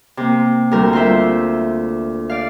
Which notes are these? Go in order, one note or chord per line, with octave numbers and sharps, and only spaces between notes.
C3 A#3
D2 G3 F#4 A#4
F4 A#4 C5 E5
D5 F5